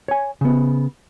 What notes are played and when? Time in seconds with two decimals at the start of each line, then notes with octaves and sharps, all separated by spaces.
0.08 C#5 G#5
0.41 C#3 B3